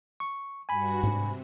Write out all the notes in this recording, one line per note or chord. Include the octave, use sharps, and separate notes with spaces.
C#6
G2 F#4 G#5 B5
G#2 C3 D4